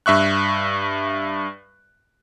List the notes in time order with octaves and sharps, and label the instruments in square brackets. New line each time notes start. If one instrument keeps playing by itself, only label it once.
[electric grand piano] G2 E5 C#6 F#6